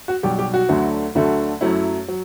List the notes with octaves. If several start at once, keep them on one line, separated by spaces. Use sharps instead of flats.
F#4
B1 B2 G3 G4
G4
F#4
D2 D3 F#3 A3
D2 D3 F#3 A3
F#2 F#3 A3 E4
F#3